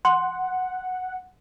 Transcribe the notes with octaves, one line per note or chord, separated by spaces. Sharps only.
F#5 C6